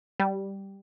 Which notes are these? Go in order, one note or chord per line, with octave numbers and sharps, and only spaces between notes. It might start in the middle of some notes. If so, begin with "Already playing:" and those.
G3